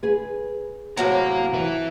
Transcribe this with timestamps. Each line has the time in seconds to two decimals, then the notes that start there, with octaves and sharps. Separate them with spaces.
0.03 G#4 B4
0.97 A2 C3 F#3 F5 A#5
1.53 E4 B4